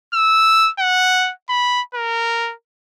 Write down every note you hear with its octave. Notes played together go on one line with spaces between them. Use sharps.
E6
F#5
B5
A#4